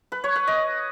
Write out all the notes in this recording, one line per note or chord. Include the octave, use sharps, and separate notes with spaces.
B4
C#5
B4
D#5